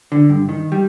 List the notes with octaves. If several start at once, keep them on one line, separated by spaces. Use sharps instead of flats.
D3
G2
D#3
G3